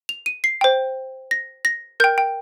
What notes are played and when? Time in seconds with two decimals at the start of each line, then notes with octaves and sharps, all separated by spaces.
0.09 F7
0.26 D#7
0.44 C7
0.61 C5 G5
1.31 A#6
1.65 A#6
2.00 A#4 G5 G6
2.18 G5